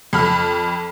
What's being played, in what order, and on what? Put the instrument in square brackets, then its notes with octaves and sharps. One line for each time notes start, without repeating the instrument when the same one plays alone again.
[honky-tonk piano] F2 B5 F6